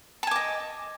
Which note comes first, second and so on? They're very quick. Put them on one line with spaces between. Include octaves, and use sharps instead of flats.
A5 G#5 D6 D#5